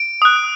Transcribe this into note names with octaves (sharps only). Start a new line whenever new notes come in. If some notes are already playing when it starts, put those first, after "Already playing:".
Already playing: D7
D#6 F#6